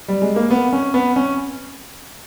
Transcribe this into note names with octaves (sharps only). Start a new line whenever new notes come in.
G3
G#3
A#3
B3
C#4
B3
C#4